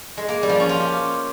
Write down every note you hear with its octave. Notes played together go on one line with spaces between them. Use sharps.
G#3
A#3
G3
F3
C#4
F4
G4